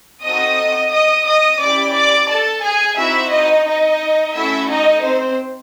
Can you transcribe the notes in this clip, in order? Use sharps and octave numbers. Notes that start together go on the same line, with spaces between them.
C4 D#4 F#4 A4 D#5 D#6
D#5 D#6
D#5 D#6
C#4 E4 G4 D5 D6
D5 D6
A4 A5
G#4 G#5
C4 D#4 E4 F#4 E5
D#4 D#5
D#4 D#5
A3 C#4 E4 F#4 A4 E5
D#4 D#5
C4 C5